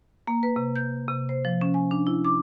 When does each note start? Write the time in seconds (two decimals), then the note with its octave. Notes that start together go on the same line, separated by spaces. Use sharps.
0.27 A#3
0.43 B4
0.56 C3
0.76 G6
1.08 C3
1.29 C5
1.45 F3
1.61 C#4
1.74 G#5
1.91 D4
2.07 E4
2.25 D6